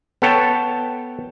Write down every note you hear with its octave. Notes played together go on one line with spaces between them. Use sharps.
B3 A4 C#5 G5 A5